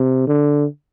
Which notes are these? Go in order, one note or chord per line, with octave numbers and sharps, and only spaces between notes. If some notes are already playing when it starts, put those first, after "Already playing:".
Already playing: C3
D3